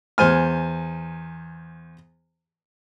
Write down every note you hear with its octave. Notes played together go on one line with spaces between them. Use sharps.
E2 C5 G#5 F6